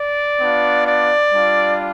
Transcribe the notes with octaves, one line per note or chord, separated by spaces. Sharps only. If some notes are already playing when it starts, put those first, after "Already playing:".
Already playing: D5
B3 D4 F4
D5
G3 D4 F4